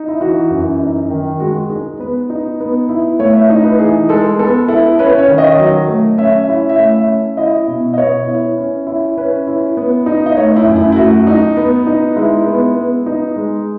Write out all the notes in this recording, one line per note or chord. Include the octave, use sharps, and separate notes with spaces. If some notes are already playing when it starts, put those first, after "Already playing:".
Already playing: D#4
E4
E3 F#4
F#2
D#4
D#3
G#3 F#4
D#4 G#4
B3 B4
D#4
B3
E4
A3 C#5
E5
D#4
B4
E3 G#4
G#3 A4
B3 A4
E4 A4
C#4 B4
C#5
D#3
D#5
F#3
A3
C#4 E5
E5
E4
E5
A3
E5
C#4
E4 D#5
B2
D#5
B3 C#5
E4
C#4
E4
C#4 B4
E4
B3
D#4
D#5
A3 C#5
E4
F#2
E4
E4
A3 F#4
D#4
B3
D#4
G#3 E4
B3
B3
D#4
G#3